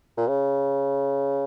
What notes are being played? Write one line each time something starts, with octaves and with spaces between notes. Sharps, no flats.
A#2
C#3